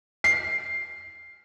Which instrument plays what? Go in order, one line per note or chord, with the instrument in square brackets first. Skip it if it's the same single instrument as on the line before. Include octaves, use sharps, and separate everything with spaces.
[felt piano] C7